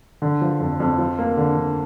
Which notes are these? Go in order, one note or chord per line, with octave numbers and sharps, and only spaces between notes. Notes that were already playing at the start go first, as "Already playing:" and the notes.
D3
F3
F2
F2
F3
A#3
D3
D3